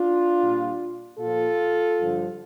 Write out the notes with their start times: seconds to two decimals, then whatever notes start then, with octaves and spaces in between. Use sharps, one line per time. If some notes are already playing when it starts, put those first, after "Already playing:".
Already playing: D4 F4
0.40 A#2 G3
1.19 A#2 F3 F4 A4
1.99 G2 D3 F3